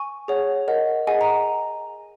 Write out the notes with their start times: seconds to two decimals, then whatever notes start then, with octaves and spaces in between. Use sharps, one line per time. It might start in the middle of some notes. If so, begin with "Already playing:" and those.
Already playing: G#5 C#6
0.28 G#4 C#5 F#5
0.68 A#4 D#5 F#5
1.07 G#4 D#5 F#5 G#5
1.21 A#5